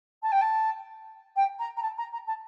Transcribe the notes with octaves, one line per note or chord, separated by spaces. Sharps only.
A5
G5
A5
G5
A#5
A#5
A5
A#5
A#5
A5